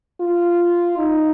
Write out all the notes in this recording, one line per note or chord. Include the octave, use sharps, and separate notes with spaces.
F4
D#4